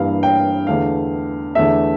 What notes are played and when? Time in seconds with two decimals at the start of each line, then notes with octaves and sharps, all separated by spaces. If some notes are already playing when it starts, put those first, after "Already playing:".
Already playing: G2 E3 G3 A#3 F5
0.23 G5
0.67 E2 D3 A3 F5
1.55 E2 D3 A3 E5